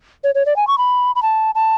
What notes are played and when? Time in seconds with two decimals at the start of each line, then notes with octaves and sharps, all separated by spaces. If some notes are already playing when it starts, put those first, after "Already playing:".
0.24 C#5
0.35 C#5
0.46 D5
0.56 G#5
0.67 C#6
0.78 B5
1.15 B5
1.22 A5
1.55 A5